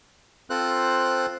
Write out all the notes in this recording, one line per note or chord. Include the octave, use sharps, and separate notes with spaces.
C4 F4 A4 C5 F#6